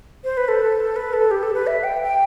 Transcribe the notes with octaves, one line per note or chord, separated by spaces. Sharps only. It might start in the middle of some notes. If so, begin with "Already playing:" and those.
C5
B4
A4
B4
A4
G4
A4
B4
E5
G5
G5